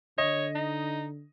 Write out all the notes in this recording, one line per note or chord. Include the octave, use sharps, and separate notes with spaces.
D3 C#5 D#5
D#4